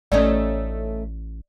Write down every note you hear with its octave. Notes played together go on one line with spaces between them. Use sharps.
A1 A3 C#4 D#4 D5